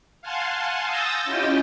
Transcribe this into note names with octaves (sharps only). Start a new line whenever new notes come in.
F5 F#5 G#5 A5 C6
D#6 E6 G6 A6 A#6
C#4 E4 F4 G4 D#5 G5